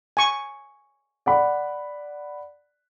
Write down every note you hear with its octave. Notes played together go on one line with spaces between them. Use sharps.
G#5 C#6
D5 F#5 B5